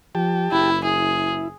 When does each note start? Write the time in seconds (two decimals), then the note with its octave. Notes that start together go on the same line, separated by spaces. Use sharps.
0.15 F3 G4 G5 A5
0.52 F#1 E4
0.84 E4 G#4